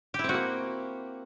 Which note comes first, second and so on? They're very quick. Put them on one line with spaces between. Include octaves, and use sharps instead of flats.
G4 E4 C4 F#4 A#3